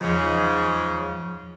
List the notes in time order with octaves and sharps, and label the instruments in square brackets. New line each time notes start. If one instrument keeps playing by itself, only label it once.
[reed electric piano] E2 F3 [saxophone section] G#2 C#3